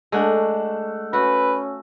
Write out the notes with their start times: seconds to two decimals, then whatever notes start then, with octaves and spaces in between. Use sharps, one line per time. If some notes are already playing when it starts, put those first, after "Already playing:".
0.12 G#3 A3 D4 F#5
1.13 C#4 F#4 B4 E5